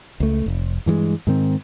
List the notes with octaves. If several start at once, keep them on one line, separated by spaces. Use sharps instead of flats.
C#2 A3
F1
G2 E3 F3 G#3
G#2 D#3 C4